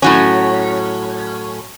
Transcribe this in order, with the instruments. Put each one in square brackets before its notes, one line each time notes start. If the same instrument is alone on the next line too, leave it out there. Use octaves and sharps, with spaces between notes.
[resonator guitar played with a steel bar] A2 F#3 C#4